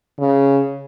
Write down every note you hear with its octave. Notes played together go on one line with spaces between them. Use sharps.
C#3